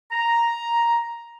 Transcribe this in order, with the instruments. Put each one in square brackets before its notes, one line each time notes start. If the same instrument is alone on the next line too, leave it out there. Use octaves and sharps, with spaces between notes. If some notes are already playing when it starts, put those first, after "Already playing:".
[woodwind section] A#5